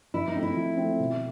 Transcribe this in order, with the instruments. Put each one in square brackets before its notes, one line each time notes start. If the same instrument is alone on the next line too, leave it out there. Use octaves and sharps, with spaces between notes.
[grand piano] F3 [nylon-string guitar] E4
[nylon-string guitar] D#4
[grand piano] A3 C4
[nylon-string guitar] E4
[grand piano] F3
A3 C4
B2